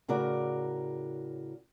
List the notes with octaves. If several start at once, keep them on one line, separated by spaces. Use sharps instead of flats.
A2 C#3 F#4 A#4 D5